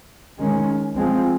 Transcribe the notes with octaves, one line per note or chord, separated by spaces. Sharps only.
D#3 G#3 C#4
F3 G#3 C4